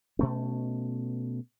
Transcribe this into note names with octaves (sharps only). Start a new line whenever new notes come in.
B2 A3 C#4